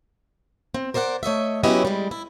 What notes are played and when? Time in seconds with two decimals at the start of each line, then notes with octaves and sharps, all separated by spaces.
0.74 C4
0.94 A#4 C5 D5 E5 F#5
1.23 A3 C#5 D#5 E5
1.63 F#3 B3 C#4 E4 G4 D#5
1.85 G3 G#3
2.11 E4